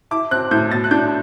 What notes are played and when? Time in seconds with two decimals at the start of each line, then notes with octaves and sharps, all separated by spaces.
0.11 E4 D6
0.31 C4 F#6
0.51 A2 G6
0.71 B2 A6
0.84 F#6
0.91 D4 G6